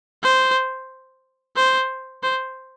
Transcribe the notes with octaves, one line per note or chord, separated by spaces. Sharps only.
C5
C5
C5